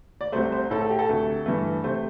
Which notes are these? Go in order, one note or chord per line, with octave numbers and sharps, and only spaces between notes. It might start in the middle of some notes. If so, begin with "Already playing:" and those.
D5
C2 C3 A3 C5
C5
A2 A3 A4
A4
G4
A4
D2 C3 A3
G2 E3 A3
C3 A3 C5